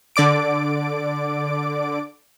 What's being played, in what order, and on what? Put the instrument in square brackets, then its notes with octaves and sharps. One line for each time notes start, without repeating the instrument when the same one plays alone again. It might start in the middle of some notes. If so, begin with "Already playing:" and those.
[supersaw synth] D3 D5 D6 D7